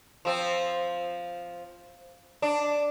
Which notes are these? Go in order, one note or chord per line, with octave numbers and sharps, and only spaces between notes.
F3 C4
D4